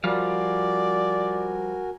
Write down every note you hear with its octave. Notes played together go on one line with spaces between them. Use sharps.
F3 G3 F#4 A#4 D5 F5 G#5